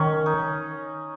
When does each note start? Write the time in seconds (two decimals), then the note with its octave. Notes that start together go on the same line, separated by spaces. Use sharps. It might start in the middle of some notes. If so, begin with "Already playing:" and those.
Already playing: D#3 C#4
0.26 D#4